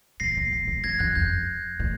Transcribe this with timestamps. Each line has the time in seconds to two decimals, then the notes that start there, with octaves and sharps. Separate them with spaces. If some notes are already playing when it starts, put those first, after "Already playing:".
0.20 A#2 A#6 C7
0.37 A#2
0.52 A2
0.67 G#2
0.84 F2 G#6 A#6
0.99 F#2 F#6 G#6
1.15 F2 G6
1.79 A2